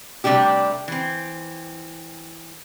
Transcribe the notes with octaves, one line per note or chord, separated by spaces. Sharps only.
C3 G3 A3 D4 G4
E3 C4